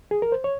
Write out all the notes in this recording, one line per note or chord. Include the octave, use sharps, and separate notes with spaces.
G#4
A#4
C5
C#5